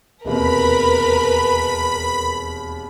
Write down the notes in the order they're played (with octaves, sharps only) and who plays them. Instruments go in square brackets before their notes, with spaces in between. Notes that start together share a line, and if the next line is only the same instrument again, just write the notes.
[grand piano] E1 D#2 C3 [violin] A#4 B4 [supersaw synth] B5